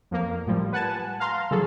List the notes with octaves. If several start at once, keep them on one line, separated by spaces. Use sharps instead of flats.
F2 A#3
A2 F3 G3
B4 F#5 G#5 A5
F5 A#5 C6
C#3 E3 F#3 G#4 A4